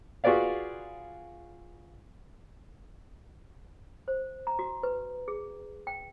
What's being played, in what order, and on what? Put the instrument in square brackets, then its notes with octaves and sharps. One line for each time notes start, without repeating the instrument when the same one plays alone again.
[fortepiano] F4 F#4 G#4 B4 D5 F5
[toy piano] C5
A#5
F#4
B4
G#4
G5